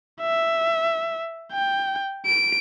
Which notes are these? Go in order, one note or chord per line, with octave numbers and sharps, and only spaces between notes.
E5
G5
D7